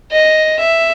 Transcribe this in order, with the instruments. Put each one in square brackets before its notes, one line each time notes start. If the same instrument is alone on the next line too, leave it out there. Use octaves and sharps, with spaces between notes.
[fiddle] D#5
E5